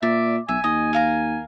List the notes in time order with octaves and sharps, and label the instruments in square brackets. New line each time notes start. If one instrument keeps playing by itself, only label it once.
[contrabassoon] A#2 [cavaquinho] D5 [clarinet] E5
[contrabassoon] B1 [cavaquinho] E5 [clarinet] G#5
[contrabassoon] D#2 [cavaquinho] D#5
[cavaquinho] A#4 F5 A#5